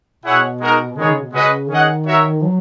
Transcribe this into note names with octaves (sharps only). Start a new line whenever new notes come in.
B2 E4 G#4 C#5 F#5
G#3 D#4 F#4 A#4
D#3 G#3 B3 D#4 G#4 C#5
C#3
B2
C#3 G#3 C#4 F#4 B4 D#5
D#3 C#4 G#4 D#5 F#5
F#4 A#4 C#5 E5
F#3